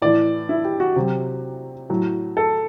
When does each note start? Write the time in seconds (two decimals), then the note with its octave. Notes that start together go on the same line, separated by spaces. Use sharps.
0.02 A2 E3 D5
0.49 E4
0.65 G4
0.80 F#4
0.96 C3 F#3 G4
1.90 A2 F#3
2.37 A4